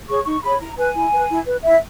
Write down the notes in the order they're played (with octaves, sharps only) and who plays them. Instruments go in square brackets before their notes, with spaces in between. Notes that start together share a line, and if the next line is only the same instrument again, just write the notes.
[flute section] G#4 C#5 C#6
D#4 C#6
G#4 C#5 B5
E4 A#5
B4 G#5
E4
B4
E4
B4
E4 E5